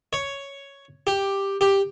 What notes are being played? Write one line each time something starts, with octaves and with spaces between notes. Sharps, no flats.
C#5
G4
G4